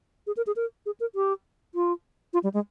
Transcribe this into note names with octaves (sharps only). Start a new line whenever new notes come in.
G#4
A#4
G#4
A#4
G#4
A#4
G4
F4
F4
G3
G#3